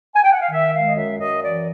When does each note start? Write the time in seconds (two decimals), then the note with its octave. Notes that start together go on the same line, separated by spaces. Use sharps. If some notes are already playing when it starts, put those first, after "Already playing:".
0.15 G#5
0.23 G5
0.32 F#5
0.41 F5
0.50 D#3 E5
0.73 G#3 F5
0.87 D#5
0.96 F#2 E5
1.19 F#2 D#5
1.42 E3 D5